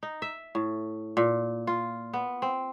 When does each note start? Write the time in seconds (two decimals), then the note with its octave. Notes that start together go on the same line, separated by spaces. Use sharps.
0.03 D#4
0.22 E5
0.55 A2
1.17 A#2
1.67 F4
2.13 B3
2.42 C4